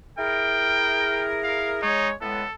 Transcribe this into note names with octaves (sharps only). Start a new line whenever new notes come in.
E4 G#4 A#4 G5
F5
G#3 D#4 C#5
A2 G#3 B3 A4